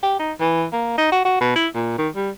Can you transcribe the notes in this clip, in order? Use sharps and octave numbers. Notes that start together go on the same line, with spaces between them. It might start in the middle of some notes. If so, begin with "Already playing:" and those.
G4
D#4
E3
A#3
D#4
F#4
F#4
B2
E4
A#2
D#3
G3